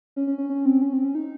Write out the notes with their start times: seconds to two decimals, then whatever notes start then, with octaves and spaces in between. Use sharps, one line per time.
0.16 C#4
0.27 C#4
0.38 C#4
0.50 C#4
0.65 C4
0.82 C#4
0.93 C4
1.04 C#4
1.15 D#4